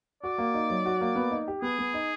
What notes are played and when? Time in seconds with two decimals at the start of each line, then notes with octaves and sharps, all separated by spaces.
0.23 F#4 D5
0.38 A#3
0.54 D#4
0.70 F#3
0.86 F#4
1.01 A#3
1.16 B3
1.31 D#4
1.48 G4
1.62 B3 G#4
1.79 B3
1.94 D#4